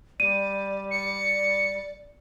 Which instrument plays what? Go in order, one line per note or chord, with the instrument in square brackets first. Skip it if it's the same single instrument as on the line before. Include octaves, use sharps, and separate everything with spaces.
[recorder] G3 [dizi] D5 [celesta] D#7
[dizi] D5 [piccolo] C#7